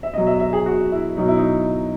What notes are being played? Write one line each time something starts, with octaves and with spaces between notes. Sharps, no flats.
E5
B2 F#3 D#5
E5
E5
G#4
F#4
E4
B2 F#3 D#4
E4
D#4